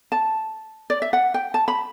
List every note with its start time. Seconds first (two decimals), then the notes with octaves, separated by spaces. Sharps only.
0.12 A5
0.90 D5
1.02 E5
1.13 F#5
1.34 G5
1.54 A5
1.68 B5